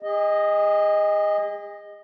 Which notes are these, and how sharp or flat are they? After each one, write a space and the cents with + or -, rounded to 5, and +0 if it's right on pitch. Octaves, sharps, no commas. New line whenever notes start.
G#4 -40 D#5 +0